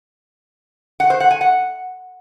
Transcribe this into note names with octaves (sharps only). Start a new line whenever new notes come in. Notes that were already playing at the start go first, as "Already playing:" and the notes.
F#5
C5
F#5
G#5
F#5